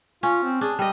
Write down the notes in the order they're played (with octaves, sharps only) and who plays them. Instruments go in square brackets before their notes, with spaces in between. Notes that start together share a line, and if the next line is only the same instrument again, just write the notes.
[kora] C#4 [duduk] F4
[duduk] C4
[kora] D4 [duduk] G#4
[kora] G3 D#5 [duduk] G4